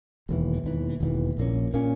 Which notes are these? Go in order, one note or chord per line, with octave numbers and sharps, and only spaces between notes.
E1 D#2 C#3 E3
E1 D#2 C#3 E3
E1 D#2 C#3 E3
A#1 A#2 A#3 C#4
A#2 A#3 C#4